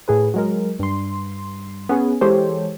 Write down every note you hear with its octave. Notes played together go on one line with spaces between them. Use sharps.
A2 G#4 B4
F#3 G#3 A#4
G2 C6
B3 C#4 G#4
E3 G#3 G4 A4 C5 C#5